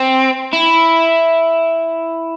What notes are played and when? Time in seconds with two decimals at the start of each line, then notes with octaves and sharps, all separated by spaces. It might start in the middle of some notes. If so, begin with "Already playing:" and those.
Already playing: C4
0.53 E4